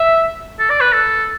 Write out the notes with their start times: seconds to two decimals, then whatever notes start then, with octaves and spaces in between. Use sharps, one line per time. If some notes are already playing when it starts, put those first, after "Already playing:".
Already playing: E5
0.59 A4
0.70 D5
0.81 B4
0.93 A4